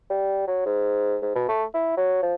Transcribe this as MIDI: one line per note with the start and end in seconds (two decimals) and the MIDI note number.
0.10 0.46 55
0.47 0.62 54
0.66 1.17 44
1.22 1.33 44
1.35 1.47 47
1.49 1.64 57
1.74 1.95 64
1.97 2.19 54
2.23 2.34 53